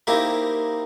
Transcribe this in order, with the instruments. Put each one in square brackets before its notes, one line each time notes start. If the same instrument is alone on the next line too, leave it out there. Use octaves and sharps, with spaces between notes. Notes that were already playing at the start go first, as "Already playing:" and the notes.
[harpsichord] A#3 C4 D#4 E4 G4 A#4